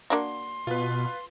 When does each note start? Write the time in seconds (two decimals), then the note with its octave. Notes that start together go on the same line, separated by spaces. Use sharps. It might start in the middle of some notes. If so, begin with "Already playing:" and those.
0.10 A#3 D4 F#4 C6
0.67 B2 F4 B4